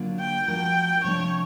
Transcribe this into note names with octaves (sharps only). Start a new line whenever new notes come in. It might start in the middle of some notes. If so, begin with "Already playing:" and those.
Already playing: D3 F#3 A#3 D4 F4
G5
F3 A3 D4 F#4 A#4 G5
C3 F3 A3 D4 C#5